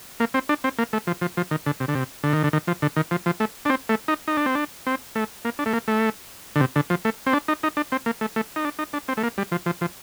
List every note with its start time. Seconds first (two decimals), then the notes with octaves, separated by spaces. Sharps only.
0.20 A#3
0.34 C4
0.49 D4
0.64 C4
0.79 A#3
0.93 A3
1.07 F3
1.22 F3
1.37 F3
1.51 D#3
1.66 D3
1.80 C3
1.88 D3
1.95 C3
2.24 D3
2.33 D#3
2.44 D3
2.53 D#3
2.67 F3
2.82 D3
2.96 D#3
3.11 F3
3.26 F3
3.40 A3
3.65 D4
3.70 C4
3.89 A3
4.08 D#4
4.28 D#4
4.37 D4
4.46 C4
4.55 D4
4.87 C4
5.16 A3
5.45 A#3
5.59 D4
5.66 A3
5.73 A#3
5.88 A3
6.56 D3
6.60 C3
6.76 D3
6.90 F3
7.05 A3
7.27 C4
7.33 D4
7.48 D#4
7.63 D#4
7.77 D4
7.92 C4
8.06 A#3
8.21 A3
8.36 A3
8.56 D#4
8.64 D4
8.79 D#4
8.93 D4
9.08 C4
9.17 A3
9.23 A#3
9.38 G3
9.52 F3
9.66 F3
9.81 F3